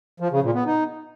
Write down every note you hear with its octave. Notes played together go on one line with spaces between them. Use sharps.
F3
C#3
A#2
B3
D#4